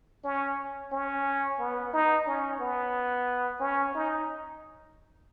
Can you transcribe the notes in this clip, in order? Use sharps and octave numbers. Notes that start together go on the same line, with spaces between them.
C#4
C#4
B3
D#4
C#4
B3
C#4
D#4